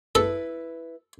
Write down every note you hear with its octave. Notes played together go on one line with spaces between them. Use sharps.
E4 A4 B4